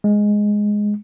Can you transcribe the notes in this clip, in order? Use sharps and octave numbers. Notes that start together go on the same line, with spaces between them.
G#3